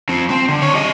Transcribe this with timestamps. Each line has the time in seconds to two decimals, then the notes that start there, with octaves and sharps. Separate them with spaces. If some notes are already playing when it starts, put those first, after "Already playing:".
0.09 F2 C4
0.30 C4
0.49 D3
0.62 D4 C#5
0.75 G3 D#5